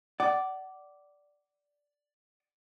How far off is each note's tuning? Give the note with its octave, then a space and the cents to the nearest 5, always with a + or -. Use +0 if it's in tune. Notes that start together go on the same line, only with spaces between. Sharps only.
D5 -5 F#5 +30